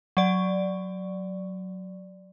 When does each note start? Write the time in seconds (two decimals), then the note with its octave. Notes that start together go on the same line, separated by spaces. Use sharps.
0.17 F#3 D5